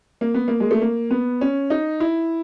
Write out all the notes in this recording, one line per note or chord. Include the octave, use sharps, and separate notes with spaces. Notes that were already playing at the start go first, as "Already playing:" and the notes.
A#3
B3
A#3
G#3
A3
A#3
B3
C#4
D#4
E4